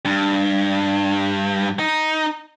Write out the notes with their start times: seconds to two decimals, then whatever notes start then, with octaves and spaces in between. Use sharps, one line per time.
0.05 G2
1.79 D#4